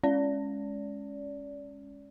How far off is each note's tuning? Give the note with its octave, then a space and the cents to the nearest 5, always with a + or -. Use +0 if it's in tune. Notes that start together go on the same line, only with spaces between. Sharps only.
G#3 +0 C#4 +0 D5 -25